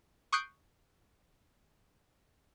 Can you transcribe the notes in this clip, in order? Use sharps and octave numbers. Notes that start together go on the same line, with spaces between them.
C#6 D#6 F#6 G6 C7 D7